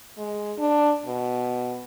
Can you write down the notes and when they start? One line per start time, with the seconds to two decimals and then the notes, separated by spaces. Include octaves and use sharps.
0.18 G#3
0.58 D4
1.06 B2